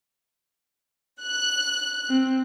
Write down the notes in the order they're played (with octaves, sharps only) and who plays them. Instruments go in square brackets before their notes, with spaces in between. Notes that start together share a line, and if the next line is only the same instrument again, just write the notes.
[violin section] F#6
[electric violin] C4